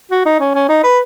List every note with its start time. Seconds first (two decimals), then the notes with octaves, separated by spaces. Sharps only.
0.11 F#4
0.25 D#4
0.40 C#4
0.55 C#4
0.69 D#4
0.84 B4